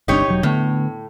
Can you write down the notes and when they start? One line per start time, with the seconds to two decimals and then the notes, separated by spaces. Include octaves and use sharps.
0.08 G1 C2 D4 D#4 G4 C#5
0.28 E1 F#3
0.43 A2 D3 A3 B3